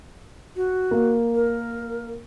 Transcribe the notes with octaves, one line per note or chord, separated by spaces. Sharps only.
F#4
A#3
A#4